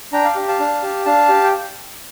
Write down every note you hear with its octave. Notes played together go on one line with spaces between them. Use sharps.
D4 G5 A#5
D5 F5
G4
F5 A5
D4
G4
D4 F5 A5
G4
G5